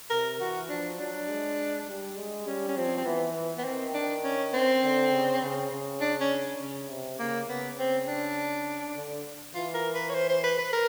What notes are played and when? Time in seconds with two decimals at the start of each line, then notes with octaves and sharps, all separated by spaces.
0.10 C3 A#4
0.40 E3 F#4
0.69 F3 D4
0.99 F#3 D4
1.29 G#3
1.88 G3
2.17 G#3
2.46 G3 C#4
2.68 C#4
2.76 F3 C4
2.97 C4
3.06 E3 B3
3.58 B3
3.64 D#3 C4
3.94 D4
4.24 C#4
4.54 C4
4.83 D3
5.12 C#3
5.42 C#3
5.72 C#3
6.01 D4
6.20 C#4
6.60 C#3
6.89 C3
7.19 C#3 A#3
7.48 C#3 B3
7.78 C4
8.07 D4
8.96 D3
9.55 E3 F4
9.74 A#4
9.94 B4
10.10 C#5
10.14 C5
10.29 C5
10.43 B4
10.58 B4
10.73 A#4